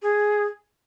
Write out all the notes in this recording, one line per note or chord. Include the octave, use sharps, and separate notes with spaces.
G#4